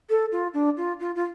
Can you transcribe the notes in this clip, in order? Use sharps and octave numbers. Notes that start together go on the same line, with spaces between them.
A4
F4
D4
F4
F4
F4